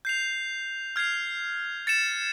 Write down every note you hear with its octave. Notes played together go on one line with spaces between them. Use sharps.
G6 C7 F7
F6 G#6 C7 F7
A6 C#7 E7